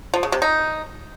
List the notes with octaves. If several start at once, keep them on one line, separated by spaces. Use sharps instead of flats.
F3
C#3
C3
D#4